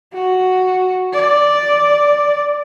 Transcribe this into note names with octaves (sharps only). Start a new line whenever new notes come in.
F#4
D5